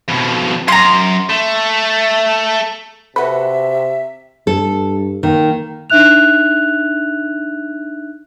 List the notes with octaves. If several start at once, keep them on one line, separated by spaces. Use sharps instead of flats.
F2 B2
F#2 A#5 C6
A3
C3 F#4 A4 B4 E5
G2 A4
D#3 A#3
D4 D#4 E5 F#6 F7